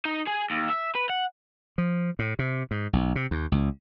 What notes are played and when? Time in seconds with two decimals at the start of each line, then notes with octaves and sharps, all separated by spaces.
0.05 D#4
0.28 G#4
0.51 D#2
0.70 E5
0.95 B4
1.09 F#5
1.78 F3
2.19 A2
2.39 C3
2.71 G#2
2.93 B1
3.15 C3
3.31 D#2
3.52 C#2